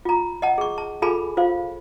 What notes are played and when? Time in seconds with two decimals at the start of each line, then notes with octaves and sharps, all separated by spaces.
0.05 F4 A#5
0.42 D#5 F#5 A5
0.58 G#4 C#6
0.78 A5
1.02 F4 G#4 A4 G#5 A5 B5
1.37 F4 C5 F5